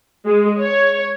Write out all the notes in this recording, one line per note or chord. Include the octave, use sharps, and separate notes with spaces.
G#3
C#5